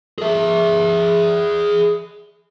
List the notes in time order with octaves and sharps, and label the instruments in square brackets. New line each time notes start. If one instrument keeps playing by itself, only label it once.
[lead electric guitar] G#4 E5